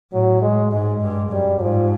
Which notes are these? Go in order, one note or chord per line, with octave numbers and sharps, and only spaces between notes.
A2 F#3
G#3
G#2 G#3
G2
F#2 G3
G#2 F3